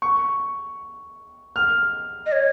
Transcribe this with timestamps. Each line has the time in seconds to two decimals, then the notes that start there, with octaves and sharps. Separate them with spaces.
0.02 C#6
1.56 F6
2.25 D#5
2.31 C#5